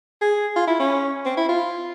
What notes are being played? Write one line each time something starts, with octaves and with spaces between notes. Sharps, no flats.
G#4
F4
E4
C#4
C4
E4
F4